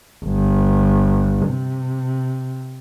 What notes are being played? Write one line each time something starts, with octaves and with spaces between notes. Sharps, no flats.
G1
C3